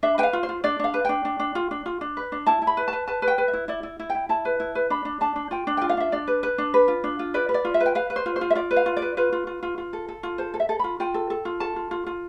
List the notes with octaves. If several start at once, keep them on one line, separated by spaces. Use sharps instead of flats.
D4 E5
B4 G5
F5
F4
C5
F4
D4 D5
D4 F5
B4
D4 G5
D4
D4
F4
D4
F4
D4
B4
D4
E4 A5
E4
B5
B4
A5
B4
B4 A5
B4
G5
B4
E5
E4
E4 D5
E4
E4
G5
E4
E4 A5
B4
E4
B4
D4 B5
D4
D4 A5
D4
F4 G5
D4
F4 G5
F5
D4 E5
D4 D5
B4
B4
D4
B4
F4
D4
F4
B4 D5
B4
D5
F4
E5
B4
G5
B4 F5
B4
C5
F4
C5
F4
E5
F4 D5
B4
F5
F4
D5
B4
F4 B4
F4
F4
F4
F4
A4
A4
F4
A4 C5
A4
E5
A4
F4 B5
F4 G5
A4
A4
F4
A4 A5
F4
F4
F4